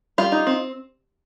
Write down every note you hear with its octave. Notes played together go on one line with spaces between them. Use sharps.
G3 F4
D#4
C4